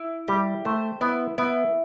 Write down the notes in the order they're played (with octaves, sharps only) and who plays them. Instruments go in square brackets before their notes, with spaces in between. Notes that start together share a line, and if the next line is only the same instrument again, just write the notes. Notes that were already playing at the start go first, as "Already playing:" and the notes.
Already playing: [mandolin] E4
[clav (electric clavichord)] G3 [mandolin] G4
[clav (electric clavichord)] A3 [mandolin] C5
[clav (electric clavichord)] B3 [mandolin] E4
[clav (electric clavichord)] B3 [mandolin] E4